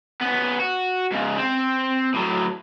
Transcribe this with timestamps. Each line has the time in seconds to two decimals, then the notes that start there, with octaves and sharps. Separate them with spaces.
0.21 B3 C#4
0.60 F#4
1.11 G#2 C#3
1.37 C4
2.14 A2 F#3